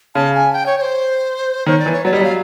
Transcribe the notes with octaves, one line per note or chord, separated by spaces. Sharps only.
C#3 A5
G#5
G5
C#5
C#5
C5
D#3 C#5
D5
E3
C#5
F#3 D5
G3 D#5
F#3 F5